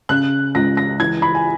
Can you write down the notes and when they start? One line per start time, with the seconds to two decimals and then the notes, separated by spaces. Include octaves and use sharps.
0.09 C#3 F#6
0.55 C#2 A#6
0.77 A#6
1.00 E3 G#6
1.22 B5
1.35 G#5